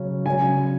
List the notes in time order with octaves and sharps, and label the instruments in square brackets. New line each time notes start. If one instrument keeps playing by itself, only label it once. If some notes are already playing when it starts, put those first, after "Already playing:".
Already playing: [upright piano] C#3 F#3 C#4
C#3 F#3 C#4 G#5